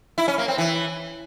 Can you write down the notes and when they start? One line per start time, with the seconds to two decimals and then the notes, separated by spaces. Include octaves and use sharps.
0.18 E4
0.28 C#4
0.38 A#3
0.48 C4
0.58 E3